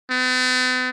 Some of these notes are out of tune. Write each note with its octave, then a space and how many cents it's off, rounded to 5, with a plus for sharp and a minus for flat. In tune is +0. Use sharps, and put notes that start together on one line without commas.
B3 +45